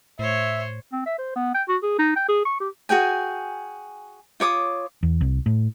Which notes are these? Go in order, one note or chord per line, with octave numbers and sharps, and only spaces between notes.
A2 C5 C#5 E5
C4
E5
C5
B3
G5
F#4
G#4
D#4
G5
G#4
C#6
G4
F#4 G#4 G5 G#5
F4 C#5 D6 D#6
E2
C2
A2